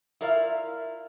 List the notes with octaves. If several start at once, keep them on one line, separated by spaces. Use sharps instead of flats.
E4 F4 A#4 D5 E5 F5